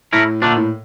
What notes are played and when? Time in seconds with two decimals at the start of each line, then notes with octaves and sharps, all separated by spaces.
0.13 A2 A3 E4 A#4
0.42 A#2 D3 A3 D4
0.57 A2